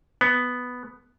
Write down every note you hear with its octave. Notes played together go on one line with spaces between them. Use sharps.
B3